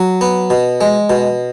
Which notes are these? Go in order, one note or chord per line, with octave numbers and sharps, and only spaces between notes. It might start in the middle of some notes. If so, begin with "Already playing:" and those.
Already playing: F#3
B3
B2
G#3
B2